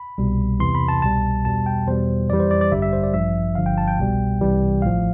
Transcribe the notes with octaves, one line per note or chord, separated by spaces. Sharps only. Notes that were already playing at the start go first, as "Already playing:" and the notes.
Already playing: B5
C2 B2 G3
E2 C3 E3 C6
B5
A5
C2 B2 G3 A5
E2 B2 G3 A5
G5
E2 B2 G3 C5
F2 E3 G3 D5
C5
D5
D5
A1 G2 D3 G3 E5
E5
C5
D5
A1 G2 F3 E5
G1 G2 D3 F3 F5
G5
A5
G5
C2 B2 G3
C2 C3 E3 G3
A1 A2 F3 F5